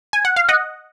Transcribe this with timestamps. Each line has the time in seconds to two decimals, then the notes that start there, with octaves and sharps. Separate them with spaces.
0.13 G#5
0.25 F#5
0.36 F5
0.49 D#5 F#5